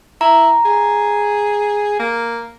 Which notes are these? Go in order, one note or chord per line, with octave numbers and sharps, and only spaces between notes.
E4 A#5
G#4
A#3